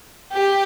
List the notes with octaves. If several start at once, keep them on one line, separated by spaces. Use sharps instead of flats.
G4